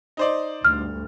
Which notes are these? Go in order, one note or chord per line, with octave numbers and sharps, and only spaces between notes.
D#4 C5 D5
D2 G2 F6